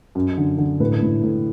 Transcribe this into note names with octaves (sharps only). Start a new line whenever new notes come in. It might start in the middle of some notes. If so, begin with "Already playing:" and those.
F#2
D3
D3
A2 B4
A2
A2